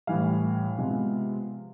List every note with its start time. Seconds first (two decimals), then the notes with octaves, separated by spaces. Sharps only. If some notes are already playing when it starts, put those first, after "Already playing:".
0.07 A2 E3 G3 F5
0.78 C3 F3 G#3 B3